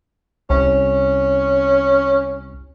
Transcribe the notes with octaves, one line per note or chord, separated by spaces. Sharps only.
C2 C#4